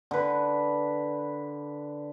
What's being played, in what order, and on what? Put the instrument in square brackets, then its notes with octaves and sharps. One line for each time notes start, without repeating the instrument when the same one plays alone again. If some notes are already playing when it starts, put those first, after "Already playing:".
[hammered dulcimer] D3 B4